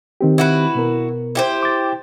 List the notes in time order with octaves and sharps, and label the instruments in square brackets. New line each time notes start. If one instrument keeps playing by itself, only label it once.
[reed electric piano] D#3 C4 G4
[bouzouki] E4 F#4 B4
[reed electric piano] B2 B3 A#4
[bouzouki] E4 G4 C5
[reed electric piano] D6 A6